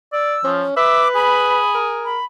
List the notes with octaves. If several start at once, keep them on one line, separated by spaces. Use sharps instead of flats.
D5 E6
F3 C#4
B4 E5 D6
G#4 B5
A#4
B5